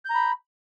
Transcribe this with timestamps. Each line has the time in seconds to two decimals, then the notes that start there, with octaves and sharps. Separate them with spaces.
0.05 G6
0.10 A#5
0.15 B5